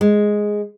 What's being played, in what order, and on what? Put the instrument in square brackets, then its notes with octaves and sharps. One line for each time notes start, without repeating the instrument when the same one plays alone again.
[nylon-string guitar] G#3